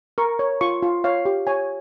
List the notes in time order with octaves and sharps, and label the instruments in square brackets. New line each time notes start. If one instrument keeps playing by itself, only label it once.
[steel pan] A#4 C#6
C#5
F4 C#6
F4
C#5 F5
G4
C#5 G#5